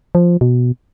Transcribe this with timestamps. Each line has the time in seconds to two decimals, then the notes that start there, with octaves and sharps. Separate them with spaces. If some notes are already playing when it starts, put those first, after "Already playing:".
0.15 F3
0.41 B2